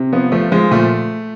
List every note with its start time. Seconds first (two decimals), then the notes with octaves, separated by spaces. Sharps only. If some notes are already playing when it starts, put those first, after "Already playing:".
Already playing: C3
0.13 F3 B3
0.32 F3 A3
0.52 F3 G#3
0.71 A#2 A3